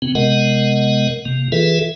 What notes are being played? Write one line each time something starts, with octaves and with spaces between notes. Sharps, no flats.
C#3 B3 C4
C3 G#3 B3 A#4 D#5 F#5
C3 A#3
E3 F4 G#4 A4 B4 E5